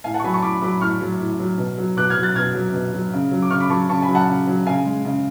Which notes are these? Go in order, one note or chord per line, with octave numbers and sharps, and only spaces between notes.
A2 F5 G#5
F#5 A5
C#6
F#3 G#5 B5
A5 C#6
A2 B5 D6
F#3 B5 D6
A2 C#6 F6
F#3
A2
F#3
B2
F#3
B2 D6 F#6
F6 G#6
F#3
F#6 A6
B2 F6 G#6
F#3
B2
F#3
C#3
F#3
D6
C#3 C#6 F6
B5 D6
F#3 A5 C#6
C#3 A5 C#6
G#5 B5
F#3
F#5 A5
C#3
F#3
C#3 F5 G#5
G#3
C#3